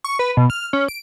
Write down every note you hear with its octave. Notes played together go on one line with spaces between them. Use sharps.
C#6
B4
B2
F6
C#4
D7